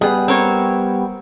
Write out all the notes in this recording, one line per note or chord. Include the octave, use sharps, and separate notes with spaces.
G3 B3 G#4
C4 A#4 C#5